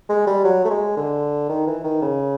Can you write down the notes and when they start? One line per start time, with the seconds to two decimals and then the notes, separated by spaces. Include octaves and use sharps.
0.09 G#3
0.27 G3
0.44 F#3
0.65 A3
0.70 G#3
0.97 D3
1.50 D#3
1.67 E3
1.84 D#3
2.02 C#3